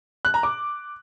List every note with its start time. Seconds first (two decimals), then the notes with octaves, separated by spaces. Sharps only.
0.25 F#6
0.34 A#5
0.43 D6